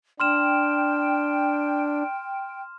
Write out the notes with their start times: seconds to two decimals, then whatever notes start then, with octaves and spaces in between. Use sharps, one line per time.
0.20 D4 G5 C6 F6 E7